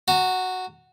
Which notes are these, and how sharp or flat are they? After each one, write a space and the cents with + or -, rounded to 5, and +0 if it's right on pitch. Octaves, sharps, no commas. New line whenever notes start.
F#4 +0 A#5 -40